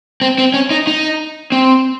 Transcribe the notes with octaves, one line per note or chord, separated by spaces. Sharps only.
C4
C4
C#4
D#4
D#4
C4